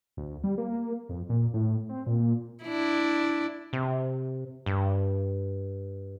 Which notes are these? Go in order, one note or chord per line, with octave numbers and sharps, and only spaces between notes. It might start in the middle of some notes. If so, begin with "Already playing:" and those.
D2
G3
A#3
F2
A#2
A2
C4
A#2
D4 E4
C3
G2